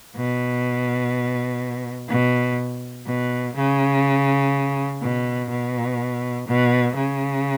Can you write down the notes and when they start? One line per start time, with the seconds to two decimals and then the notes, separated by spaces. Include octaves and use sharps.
0.15 B2
2.09 B2
3.07 B2
3.55 C#3
5.01 B2
5.49 B2
6.47 B2
6.95 C#3